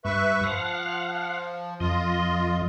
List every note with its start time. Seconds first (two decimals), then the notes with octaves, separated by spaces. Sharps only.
0.05 G2 B4 E5 C#6
0.44 F3 F5 F#5
1.80 F2 F4 D#5